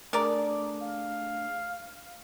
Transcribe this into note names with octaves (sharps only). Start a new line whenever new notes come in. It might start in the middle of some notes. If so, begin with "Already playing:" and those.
A3 D4 G#4 A#4 D5
F5